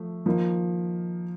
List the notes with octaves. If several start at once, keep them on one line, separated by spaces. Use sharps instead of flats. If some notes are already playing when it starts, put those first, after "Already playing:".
Already playing: F3 A3
F3 A#3 D#4